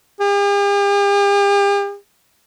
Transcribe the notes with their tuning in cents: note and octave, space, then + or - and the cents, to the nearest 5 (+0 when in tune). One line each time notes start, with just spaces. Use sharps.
G4 +45